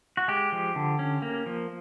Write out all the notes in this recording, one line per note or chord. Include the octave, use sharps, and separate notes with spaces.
F#4
G#3 G4
F3
D3
C#4
A#3
F3